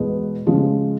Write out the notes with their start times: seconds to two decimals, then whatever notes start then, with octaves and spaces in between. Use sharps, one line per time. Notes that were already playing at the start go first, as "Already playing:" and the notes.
Already playing: E2 B2 G#3 B3
0.46 C#3 F3 G#3